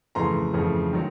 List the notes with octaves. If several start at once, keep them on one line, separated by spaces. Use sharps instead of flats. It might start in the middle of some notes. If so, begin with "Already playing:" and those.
F2 C#3 E3 A3 A#5 C6
F2 C#3 E3 A3
D#3 F#3